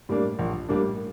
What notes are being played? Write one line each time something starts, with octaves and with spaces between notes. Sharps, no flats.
A2 G3 A#3 D4
A#1
A2 G3 A#3 D4